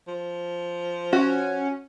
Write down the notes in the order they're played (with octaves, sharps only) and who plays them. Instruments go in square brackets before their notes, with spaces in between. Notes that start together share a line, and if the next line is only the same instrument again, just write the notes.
[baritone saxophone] F3
[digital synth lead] C#4 [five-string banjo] F#4